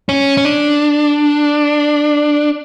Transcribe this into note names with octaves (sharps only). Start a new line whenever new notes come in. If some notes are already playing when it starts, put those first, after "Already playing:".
C#4
C#4
D4